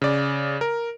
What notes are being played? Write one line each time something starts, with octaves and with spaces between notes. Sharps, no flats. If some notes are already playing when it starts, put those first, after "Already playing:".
C#3 D5
A#4